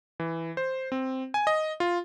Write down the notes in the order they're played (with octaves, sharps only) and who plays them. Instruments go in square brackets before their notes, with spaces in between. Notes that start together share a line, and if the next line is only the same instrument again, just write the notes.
[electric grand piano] E3
C5
C4
G#5
D#5
F4